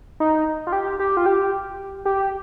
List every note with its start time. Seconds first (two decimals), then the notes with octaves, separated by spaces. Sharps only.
0.20 D#4
0.67 F4
0.72 G4
0.99 G4
1.17 F4
1.26 G4
2.05 G4